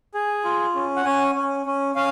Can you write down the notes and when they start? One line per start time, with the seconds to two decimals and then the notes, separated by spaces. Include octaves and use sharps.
0.14 G#4
0.45 F4
0.75 C#4
0.96 F#5
1.05 C#4 G#5
1.35 C#4
1.66 C#4
1.95 C#4 F5